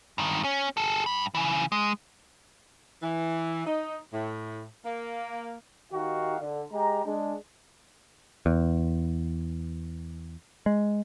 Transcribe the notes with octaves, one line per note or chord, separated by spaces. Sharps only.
G2 D#3
C#4
G#4 A4
G2 B5
C#3 E3
G#3
E3
D#4
A2
A#3
D#3 D#4 F#4 G4 F5
D3
G#3 G4 A#5
G#3 D4
E2
G#3